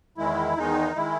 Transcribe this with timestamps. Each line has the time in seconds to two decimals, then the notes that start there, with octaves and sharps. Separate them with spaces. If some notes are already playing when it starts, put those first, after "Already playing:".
0.18 E2 D#3 G#3 E4
0.57 E2 D#3 G#3 D#4
0.96 D#3 G#3 E4